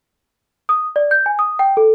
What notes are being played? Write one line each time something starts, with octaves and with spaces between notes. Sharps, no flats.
D#6
D5
G6
G#5
D#6
G5
A4